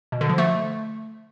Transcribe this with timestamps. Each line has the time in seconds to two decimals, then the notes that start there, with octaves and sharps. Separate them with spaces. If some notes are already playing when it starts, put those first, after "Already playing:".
0.12 B2
0.21 D3
0.29 F3
0.38 A3